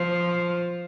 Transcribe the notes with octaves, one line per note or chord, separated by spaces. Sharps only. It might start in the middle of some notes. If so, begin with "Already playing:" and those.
Already playing: F3